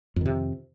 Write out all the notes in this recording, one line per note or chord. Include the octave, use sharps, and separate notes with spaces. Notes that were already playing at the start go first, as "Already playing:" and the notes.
F2 C3 D#3